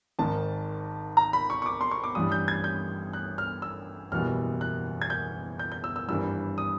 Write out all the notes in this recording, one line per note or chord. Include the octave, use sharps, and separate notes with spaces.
G#1 G#2 D#3 A5
A#5
B5
C#6
C#6
D6
C6
C#6
D6
A1 G2 E3 G3 D#6
G6
G#6
G6
F#6
F6
E6
F#1 E2 B2 G3 F6
F#6
G#6
G6
G6
G6
E6
E6
G#1 G2 E3 G3 E6
D#6